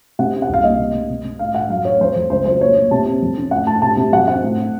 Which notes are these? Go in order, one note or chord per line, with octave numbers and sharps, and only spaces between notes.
C3 F#5
C#4
F#5
C2 F5
A#3 D#5
C3
C3
C3
C3
A2 F5
A2 F#5
F#2 F5
A3 C#5
F2 C5
F2
C#2 C5
F#3 C5
A#2 C#5
A#2
C3 A5
C4
F2
C#4
A2 F#5
A2 A5
C3 A5
C3
F#2 F#5
C4 F#5
A2
A2